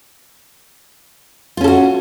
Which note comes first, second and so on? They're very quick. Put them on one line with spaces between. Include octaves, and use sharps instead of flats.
F4 C#4 A4 F#4